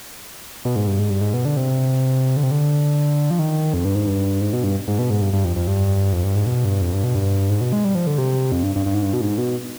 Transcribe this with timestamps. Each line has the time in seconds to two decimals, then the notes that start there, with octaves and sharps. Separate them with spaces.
0.65 B2
0.76 G#2
0.87 G2
0.99 G#2
1.10 G2
1.21 G#2
1.34 B2
1.45 D3
1.57 C3
2.37 D3
2.43 C3
2.51 D3
3.31 F3
3.39 D#3
3.74 F2
3.85 G2
3.95 G#2
4.07 G2
4.41 G#2
4.53 B2
4.64 G2
4.88 G#2
4.99 B2
5.10 G#2
5.21 G2
5.33 G2
5.45 F2
5.56 F2
5.67 G2
6.13 F2
6.24 G2
6.35 G#2
6.46 B2
6.65 G2
6.81 F2
6.93 G2
7.04 B2
7.15 G2
7.50 G#2
7.61 B2
7.73 G#3
7.85 G3
7.95 F3
8.07 D3
8.18 C3
8.52 F2
8.63 G2
8.76 G2
8.86 G2
8.94 G#2
9.02 G2
9.13 B2
9.21 G#2
9.38 B2